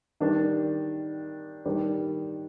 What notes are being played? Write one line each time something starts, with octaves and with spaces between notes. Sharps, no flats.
D#3 G3 D4
D#3 G3 D4